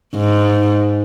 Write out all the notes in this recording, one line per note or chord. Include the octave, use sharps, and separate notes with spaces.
G#2